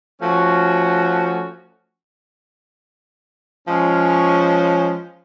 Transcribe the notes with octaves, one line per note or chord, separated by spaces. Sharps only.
F3 A3 C#4 F#4
F3 G#3 C#4